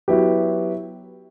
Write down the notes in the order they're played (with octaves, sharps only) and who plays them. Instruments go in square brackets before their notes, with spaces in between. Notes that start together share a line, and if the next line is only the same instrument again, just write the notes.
[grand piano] F#3 B3 E4 G4